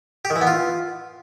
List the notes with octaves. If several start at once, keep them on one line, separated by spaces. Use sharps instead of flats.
G4
D#3
E3
B3
F4